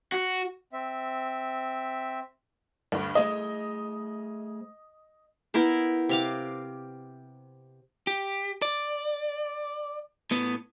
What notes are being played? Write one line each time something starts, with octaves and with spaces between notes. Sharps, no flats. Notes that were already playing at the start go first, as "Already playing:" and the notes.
F#4
C4 E5
D2 G2
A3 G#4 C5 D#5
B3 E4 A#4 C5
C3 F5 D6
G4
D5
A2 B3